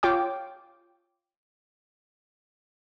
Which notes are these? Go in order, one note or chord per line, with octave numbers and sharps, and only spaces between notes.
F4 C#5 G5 D6